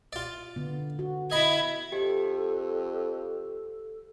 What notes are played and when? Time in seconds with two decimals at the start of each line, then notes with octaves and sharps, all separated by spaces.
0.13 F4 D5
0.56 D3 B3
0.99 F#4
1.32 E4 D#5 B5 G#6
1.92 F2 G4 A4